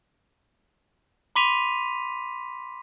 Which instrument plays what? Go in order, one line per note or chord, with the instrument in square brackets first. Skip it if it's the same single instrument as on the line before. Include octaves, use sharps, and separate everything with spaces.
[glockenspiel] B5 C6 D6 B6 D#7 F7